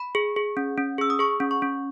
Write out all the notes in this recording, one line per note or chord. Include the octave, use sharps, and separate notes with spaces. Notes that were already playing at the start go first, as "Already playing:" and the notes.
Already playing: B5
G#4
G#4
C#4
C#4
G#4 E6
D#6
G#4 C#6
C#4
C#6
C#4